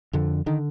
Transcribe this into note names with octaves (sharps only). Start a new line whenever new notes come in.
F2 D3
D3 D#3